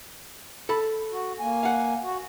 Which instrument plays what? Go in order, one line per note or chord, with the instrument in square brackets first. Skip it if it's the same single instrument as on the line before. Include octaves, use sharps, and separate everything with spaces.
[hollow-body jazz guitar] A4 B5
[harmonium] F#4
A#3 G#5
[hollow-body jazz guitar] F5 F#5
[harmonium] F#4